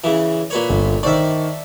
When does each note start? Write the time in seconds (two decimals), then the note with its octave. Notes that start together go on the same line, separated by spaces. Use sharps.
0.04 C#3 E3
0.50 A#2 B4 C#5
0.69 G1
1.03 D#3 D4 C5 E5 C#6